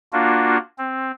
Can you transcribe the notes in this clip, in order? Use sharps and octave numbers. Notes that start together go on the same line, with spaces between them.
A#3 D4 F4 F#4
C4